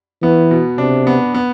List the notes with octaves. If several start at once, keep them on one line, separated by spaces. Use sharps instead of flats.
E3 B3
B2
C3 D4
B3
B3